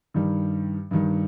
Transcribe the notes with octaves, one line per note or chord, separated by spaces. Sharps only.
G2 D#3 G3
G2 D#3 G3